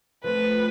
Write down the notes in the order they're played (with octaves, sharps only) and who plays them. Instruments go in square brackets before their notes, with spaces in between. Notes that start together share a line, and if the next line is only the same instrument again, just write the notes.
[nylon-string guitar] F3 A3 C4 [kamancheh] B4